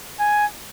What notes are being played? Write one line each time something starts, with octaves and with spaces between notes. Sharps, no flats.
G#5